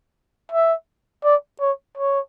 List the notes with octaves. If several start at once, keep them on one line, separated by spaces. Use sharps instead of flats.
E5
D5
C#5
C#5